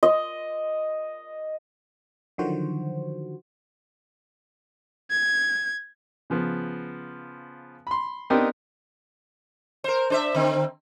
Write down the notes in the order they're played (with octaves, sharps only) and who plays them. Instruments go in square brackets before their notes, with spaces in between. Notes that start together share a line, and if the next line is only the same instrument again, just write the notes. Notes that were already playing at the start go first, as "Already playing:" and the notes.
[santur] D#5
[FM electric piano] D3 D#3 F3 F#3 F#4 C5
[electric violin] G#6
[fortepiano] C#3 F3 B3
B5 C6
B3 C4 D4 D#4 G4 A#4
[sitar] A#4 C5
D4 C5 E5
D3 C4